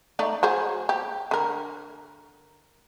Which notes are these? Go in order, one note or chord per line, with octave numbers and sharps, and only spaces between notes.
A3 D#4 D5
F#3 G#4 C5
G4
D3 A#4